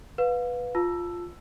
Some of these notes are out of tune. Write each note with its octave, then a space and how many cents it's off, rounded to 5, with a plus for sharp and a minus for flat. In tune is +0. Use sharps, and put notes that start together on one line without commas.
B4 +0 F5 +30
F4 +5 A5 +0 E6 +10